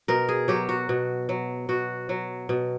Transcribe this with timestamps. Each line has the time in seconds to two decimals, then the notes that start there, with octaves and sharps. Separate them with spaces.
0.08 B2 A#4
0.29 G#4
0.48 F#3 G4
0.69 F#4
0.89 B2
1.29 F#3
1.69 B2 F#4
2.09 F#3
2.49 B2